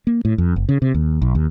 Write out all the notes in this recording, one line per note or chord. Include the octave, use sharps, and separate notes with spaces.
A#3
A2
F2
F#1
C#3
C3
D#2
B1
D#2